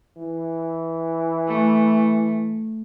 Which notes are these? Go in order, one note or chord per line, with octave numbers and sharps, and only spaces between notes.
E3
A3